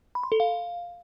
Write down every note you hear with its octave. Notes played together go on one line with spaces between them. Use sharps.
B5
C6
A4
F5